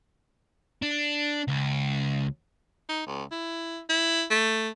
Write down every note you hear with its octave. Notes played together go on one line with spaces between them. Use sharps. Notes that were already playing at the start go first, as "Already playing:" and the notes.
D4
C#2
D#4
C#2
E4
E4
A3